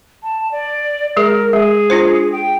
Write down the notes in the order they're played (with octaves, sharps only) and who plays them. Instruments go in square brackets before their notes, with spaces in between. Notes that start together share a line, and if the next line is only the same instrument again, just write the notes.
[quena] A5
D5
[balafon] G#3 G#4 [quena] A#4
[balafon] G#3 [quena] G#4
[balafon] D4 F4 C5
[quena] G5